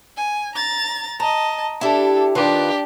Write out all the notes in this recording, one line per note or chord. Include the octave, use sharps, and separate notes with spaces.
G#5
A#5 A6
D#5 A5 A#5
D4 E4 G4 A4
D#3 D4 F4 G4 B4